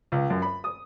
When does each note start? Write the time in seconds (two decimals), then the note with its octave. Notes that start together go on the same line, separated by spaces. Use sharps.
0.12 C#2
0.30 F#2
0.42 B5
0.64 D#6